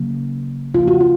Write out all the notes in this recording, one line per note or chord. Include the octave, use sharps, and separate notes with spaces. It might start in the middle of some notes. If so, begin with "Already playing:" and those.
Already playing: C#3 F#3 A#3
C#3 F3 A#3 F4
F#4
F4